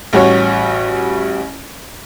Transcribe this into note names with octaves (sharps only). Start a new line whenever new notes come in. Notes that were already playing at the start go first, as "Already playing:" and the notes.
A1 G3 F#4 C#5